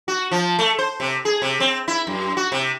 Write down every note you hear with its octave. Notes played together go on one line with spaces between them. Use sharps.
F#4
F3
A3
C5
C3
G#4
C3
C4
E4
F#2
F#4
C3